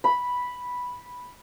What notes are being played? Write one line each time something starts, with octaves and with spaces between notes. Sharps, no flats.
B5